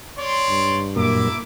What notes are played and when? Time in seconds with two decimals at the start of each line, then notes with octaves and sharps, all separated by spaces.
0.17 C#5 D5 C6
0.50 G2
0.96 F#2 A#2 A#3 E4 E5 D6